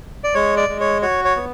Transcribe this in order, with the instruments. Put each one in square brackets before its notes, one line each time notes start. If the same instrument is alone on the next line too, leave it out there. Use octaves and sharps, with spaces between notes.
[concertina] D5
G#3 C#5
D5
G#3
C#5
F#4 C#5
C#5
B3